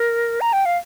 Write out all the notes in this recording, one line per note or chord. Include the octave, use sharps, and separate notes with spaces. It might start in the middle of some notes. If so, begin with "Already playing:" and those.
Already playing: A#4
A#5
G5
F5